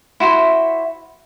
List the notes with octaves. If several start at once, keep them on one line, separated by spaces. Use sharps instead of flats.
E4 F#4 C5 E5